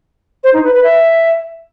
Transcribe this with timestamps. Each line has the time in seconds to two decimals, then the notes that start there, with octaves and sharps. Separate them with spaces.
0.43 C5
0.53 D#4
0.63 B4
0.74 B4
0.84 E5